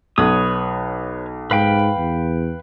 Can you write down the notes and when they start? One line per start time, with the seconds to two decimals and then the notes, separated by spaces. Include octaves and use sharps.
0.18 B1 B4 C#5 D#6
1.51 G#2 B4 F5 G5
1.97 E2